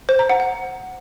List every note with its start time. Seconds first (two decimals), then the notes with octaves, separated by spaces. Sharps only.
0.09 C5
0.19 A#5
0.29 F#5
0.40 F#5